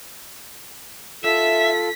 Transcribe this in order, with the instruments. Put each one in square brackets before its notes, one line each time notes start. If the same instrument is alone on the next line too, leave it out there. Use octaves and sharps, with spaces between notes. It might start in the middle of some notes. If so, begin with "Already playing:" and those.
[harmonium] F4 A4 [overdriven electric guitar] E5 [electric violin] B6